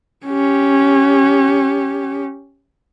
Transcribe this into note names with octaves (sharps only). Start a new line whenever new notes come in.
C#4 G4